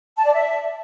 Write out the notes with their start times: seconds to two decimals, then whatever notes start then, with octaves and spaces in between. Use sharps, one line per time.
0.18 A5
0.25 D5
0.33 E5